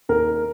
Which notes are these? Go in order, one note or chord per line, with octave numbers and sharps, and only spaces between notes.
D#2 A#4